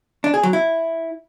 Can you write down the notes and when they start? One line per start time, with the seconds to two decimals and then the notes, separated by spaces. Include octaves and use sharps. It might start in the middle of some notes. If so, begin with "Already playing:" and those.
0.24 D4
0.34 G#4
0.43 F#3
0.53 E4